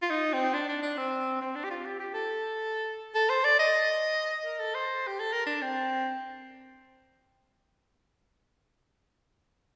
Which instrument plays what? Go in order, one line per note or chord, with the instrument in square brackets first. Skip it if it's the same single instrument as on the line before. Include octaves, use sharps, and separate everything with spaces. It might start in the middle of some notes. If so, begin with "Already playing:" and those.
[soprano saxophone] F4
D#4
C4
D4
D4
D4
C4
C4
D4
G4
F4
G4
G4
A4
A4
C5
D5
D#5
A#4
A4
C5
G4
A4
A#4
D4
C4